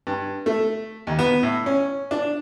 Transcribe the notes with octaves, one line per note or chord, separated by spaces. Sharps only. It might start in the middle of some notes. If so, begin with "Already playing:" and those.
G2
A3
D#2
B3
A2
C#4
D4